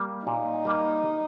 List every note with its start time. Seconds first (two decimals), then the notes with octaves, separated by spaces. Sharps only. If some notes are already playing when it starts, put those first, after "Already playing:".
Already playing: G3 A#3
0.26 A#2 D#4
0.65 G3 A#3